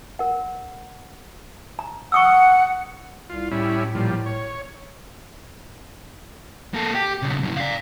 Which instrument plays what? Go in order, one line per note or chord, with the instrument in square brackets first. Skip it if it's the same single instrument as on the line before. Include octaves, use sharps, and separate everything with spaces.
[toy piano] A#4 F#5
A#5
[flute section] F#5 [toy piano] C#6 D#6 E6
[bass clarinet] C2 [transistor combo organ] F4
[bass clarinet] A2 [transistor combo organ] G3 C#4 E4
[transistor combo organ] A#2 F3 G3
C#5
[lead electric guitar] A#3 A4
G4
B1 C#3
F#2 C#3
D5 F5